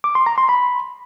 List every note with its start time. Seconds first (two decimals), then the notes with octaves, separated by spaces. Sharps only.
0.04 D6
0.15 C6
0.26 A#5
0.38 C6
0.49 B5